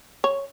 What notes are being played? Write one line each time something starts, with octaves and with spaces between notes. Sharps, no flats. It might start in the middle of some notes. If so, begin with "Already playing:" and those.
C#5